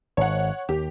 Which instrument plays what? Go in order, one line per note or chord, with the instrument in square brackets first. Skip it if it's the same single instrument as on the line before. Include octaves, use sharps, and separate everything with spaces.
[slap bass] G#1 [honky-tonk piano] C#5 F#5
[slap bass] D#2 [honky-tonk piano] G4